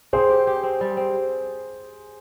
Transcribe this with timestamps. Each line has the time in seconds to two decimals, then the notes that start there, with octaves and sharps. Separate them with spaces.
0.13 C4 G#4 C5
0.29 G4
0.47 G4
0.63 C4
0.81 G3
0.97 C4